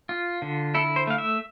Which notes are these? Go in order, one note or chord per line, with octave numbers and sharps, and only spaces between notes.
F4
D3
E4 A4
C5
A3 F5
E5